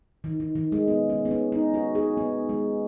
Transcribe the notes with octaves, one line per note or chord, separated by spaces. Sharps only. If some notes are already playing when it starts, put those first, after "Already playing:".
D#3
D#3
D#3
G#3
B3
C#4
B3
C#4
D#4
F#4
G#4
B3
G#3